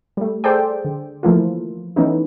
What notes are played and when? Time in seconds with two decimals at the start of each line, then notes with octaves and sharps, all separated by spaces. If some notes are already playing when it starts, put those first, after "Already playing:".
0.17 G3 A3
0.44 G#4 A4 C5 D5 G5
0.85 D3
1.23 E3 F3 A3 A#3 E4 F4
1.96 E3 A3 B3 C#4 D#4 E4